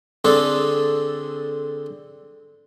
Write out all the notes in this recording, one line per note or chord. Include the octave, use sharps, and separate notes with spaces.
D3 C4 D4 G#4 A4